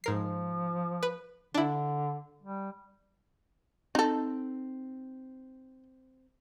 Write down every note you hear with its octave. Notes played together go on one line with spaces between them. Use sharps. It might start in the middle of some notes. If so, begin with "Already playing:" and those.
G#2 F3 A#4 C7
B4
D3 D4 E4
G3
C4 D#4 A4